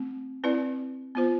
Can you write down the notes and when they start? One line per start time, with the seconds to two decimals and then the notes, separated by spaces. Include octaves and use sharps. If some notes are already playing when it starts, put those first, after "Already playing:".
Already playing: A3 C4
0.44 C4 E4 B4 D5
1.15 B3 F4 C5